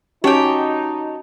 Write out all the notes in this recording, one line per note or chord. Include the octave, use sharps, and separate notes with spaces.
C#4 D#4 F#4 G4 C#5 G5 A5